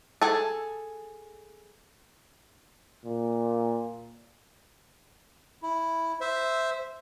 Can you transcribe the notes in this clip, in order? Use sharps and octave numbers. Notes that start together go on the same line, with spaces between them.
G#4 A4
A#2
E4
C5 E5